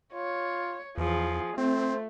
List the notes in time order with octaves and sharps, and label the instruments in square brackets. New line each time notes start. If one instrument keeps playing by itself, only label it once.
[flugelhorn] F4 [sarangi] C#5
[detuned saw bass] E2 [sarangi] F3 [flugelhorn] G#4
[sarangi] A3 [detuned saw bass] C4 [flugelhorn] C5